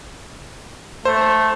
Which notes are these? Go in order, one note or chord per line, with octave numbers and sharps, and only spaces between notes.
A3 C5